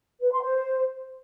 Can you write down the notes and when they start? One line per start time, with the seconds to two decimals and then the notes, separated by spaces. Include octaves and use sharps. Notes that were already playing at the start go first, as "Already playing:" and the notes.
0.22 B4
0.32 C6
0.42 C5